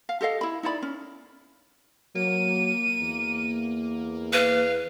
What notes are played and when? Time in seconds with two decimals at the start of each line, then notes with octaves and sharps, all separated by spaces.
0.09 F5
0.21 G4 A4 D#5 F5
0.41 E4 B5
0.63 D#4 E4 D5 B5
0.82 C#4
2.15 F#3 A#3 D#7
3.01 E2
4.33 B4 F5